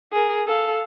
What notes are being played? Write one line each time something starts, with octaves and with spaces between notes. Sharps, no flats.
G#4 A#4
A4 F5